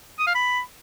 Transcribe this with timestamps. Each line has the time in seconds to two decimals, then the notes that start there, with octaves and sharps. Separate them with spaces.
0.19 D#6
0.27 F5
0.35 B5